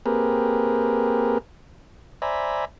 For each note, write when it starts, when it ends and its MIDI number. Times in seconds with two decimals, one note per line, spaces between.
0.06 1.38 58
0.06 1.38 60
0.06 1.38 67
0.06 1.38 68
0.06 1.38 70
0.06 1.38 71
2.22 2.65 72
2.22 2.65 74
2.22 2.65 76
2.22 2.65 80
2.22 2.65 82
2.22 2.65 83